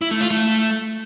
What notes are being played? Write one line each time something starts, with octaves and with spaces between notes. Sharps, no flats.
E4
A3
F4
A3